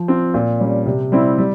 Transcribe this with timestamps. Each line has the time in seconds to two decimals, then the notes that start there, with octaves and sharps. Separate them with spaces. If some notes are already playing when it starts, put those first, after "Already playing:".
Already playing: F3
0.08 C4 F4
0.34 A#2
0.60 G3 C#4
0.86 C3
1.12 G3 C4 E4
1.38 G3